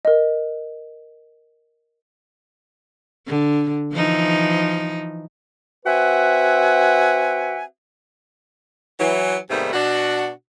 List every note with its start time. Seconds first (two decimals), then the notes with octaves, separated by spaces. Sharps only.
0.05 A#4 D#5
3.27 D3
3.93 E3 F3 D#4
5.86 C4 F#4 B4 E5 F#5 G#5
8.99 E3 F#3
9.50 G#2 C3 D#3 G3 A3 B3
9.73 B2 D4 F#4